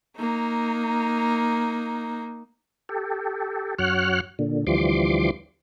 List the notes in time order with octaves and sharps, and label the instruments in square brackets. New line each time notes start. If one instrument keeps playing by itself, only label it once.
[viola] A#3 D#4
[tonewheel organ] G4 A4
F#2 F#4 C#5 F#5 F6 F#6
A#2 D3
D2 E3 F3 G3 C6 D6